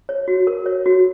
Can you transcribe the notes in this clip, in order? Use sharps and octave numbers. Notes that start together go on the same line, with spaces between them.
C#5
F#4
A#4
C#5
F#4